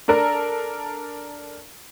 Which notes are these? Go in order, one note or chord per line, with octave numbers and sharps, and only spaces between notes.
D4 A4 A#4 A#5